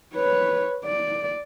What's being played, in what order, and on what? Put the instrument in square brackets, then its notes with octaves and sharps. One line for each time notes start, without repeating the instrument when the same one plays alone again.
[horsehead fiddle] B4 C#5
D5